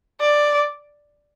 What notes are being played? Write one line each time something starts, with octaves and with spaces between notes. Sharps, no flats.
D5